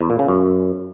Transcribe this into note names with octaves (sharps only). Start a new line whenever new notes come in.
E2
A#2
C#3
F#2